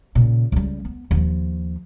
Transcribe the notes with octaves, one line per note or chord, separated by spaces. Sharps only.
A#2 C#3
C#2 G3
B3
D#2 F3